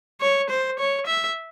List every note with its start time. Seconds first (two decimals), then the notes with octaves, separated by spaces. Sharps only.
0.21 C#5
0.50 C5
0.79 C#5
1.07 E5